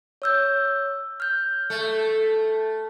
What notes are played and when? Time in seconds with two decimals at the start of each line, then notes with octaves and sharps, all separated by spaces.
0.22 C#5 E6 G6
1.20 F6 G6
1.70 A3